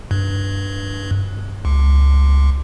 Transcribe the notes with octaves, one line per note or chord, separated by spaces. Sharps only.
G2
C#2